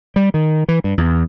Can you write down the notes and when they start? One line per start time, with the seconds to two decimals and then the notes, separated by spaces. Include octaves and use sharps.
0.16 G3
0.34 D#3
0.68 E3
0.84 G2
0.98 E2